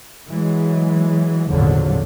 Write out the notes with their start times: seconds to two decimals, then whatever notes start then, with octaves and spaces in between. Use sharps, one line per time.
0.27 E3 F#3 G#3
1.49 G#1 E2 A#2 D3 F3 F#3